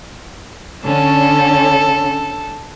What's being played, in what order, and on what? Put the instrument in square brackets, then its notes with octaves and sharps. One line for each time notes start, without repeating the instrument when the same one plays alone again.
[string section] D3 C#4 [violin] A4